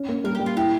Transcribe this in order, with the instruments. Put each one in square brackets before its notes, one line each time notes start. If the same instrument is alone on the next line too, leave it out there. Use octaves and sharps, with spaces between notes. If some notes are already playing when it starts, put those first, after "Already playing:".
Already playing: [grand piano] C#4
A#3
[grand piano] G3 [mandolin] A#4
[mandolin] G4
[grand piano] G3
[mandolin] F4
[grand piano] E4 [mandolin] G4